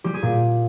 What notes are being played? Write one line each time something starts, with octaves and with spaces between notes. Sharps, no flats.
G3 G4
G#4
A#2